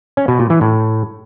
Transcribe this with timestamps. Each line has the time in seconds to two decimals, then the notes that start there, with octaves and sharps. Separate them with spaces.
0.17 C#4
0.28 B2
0.39 A#2
0.50 E3
0.61 A2